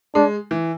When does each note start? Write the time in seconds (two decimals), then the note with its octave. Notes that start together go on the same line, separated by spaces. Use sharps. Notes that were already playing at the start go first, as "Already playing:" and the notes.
0.15 G#3 D4
0.51 E3